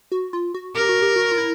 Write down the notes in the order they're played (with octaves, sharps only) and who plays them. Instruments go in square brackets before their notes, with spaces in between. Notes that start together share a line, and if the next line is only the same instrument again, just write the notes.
[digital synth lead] F#4
F4
F#4
[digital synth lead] G4 [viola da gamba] A#4
[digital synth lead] F#4
G4
F#4
F4
E4